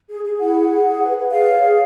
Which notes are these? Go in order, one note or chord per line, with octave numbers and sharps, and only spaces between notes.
G#4
G#4
E4 F#5
G#4
G#4
G#4
B4
B4
G#4 F5
C#5
G#4